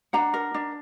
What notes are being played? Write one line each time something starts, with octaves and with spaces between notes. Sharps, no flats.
D4 F#5 A#5
A#4
D4